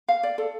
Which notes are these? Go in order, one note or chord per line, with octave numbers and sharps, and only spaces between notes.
F5
D5
A4